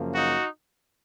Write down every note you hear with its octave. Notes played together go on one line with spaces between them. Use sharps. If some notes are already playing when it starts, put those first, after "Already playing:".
Already playing: F#2 C#3 F3 A#3
D#4 F#4